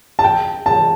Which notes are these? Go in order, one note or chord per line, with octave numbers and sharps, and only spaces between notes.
A5
G5
A5